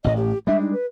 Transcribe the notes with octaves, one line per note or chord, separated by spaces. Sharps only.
A1 A2 D#5
G4
G3 G#3 D4 E5
D#4
B4